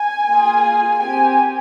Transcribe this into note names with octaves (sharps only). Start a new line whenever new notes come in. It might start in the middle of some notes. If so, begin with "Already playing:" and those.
Already playing: G#5
A#3 F4 G#4
C4 G4 G#5